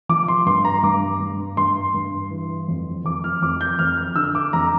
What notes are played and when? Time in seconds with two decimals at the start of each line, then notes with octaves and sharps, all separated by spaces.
0.09 F3 D6
0.28 C6
0.46 G2 C6
0.65 A#5
0.83 G2 D6
1.20 G2
1.57 G2 C6
1.94 G2
2.31 E3
2.68 F2
3.05 F2 D6
3.24 F6
3.42 F2 D6
3.61 G6
3.79 F2 F6
3.98 F6
4.16 D3 E6
4.35 D6
4.53 F2 A#5